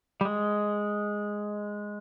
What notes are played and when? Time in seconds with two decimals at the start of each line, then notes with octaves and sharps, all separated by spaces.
0.21 G3
0.25 G#3